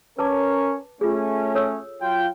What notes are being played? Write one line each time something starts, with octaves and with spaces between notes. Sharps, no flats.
C#4 A#4 B4 C#5 A5 D6
A3 C#4 F4 G#4
A4 C#5 E6
F#3 F4 G5